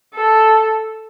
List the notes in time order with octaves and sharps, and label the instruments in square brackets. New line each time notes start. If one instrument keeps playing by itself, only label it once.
[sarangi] A4